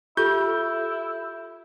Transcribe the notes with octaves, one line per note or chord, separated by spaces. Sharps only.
E4 F4 G4 A4 G6